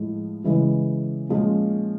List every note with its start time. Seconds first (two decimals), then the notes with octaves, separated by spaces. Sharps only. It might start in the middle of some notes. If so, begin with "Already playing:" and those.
Already playing: A2 F3 G#3
0.44 C#3 E3 G#3
1.29 A#2 F3 G#3 C#4